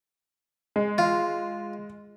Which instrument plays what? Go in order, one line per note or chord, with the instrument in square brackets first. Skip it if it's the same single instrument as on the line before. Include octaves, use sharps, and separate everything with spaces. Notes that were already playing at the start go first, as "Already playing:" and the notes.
[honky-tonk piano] G#3
[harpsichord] F4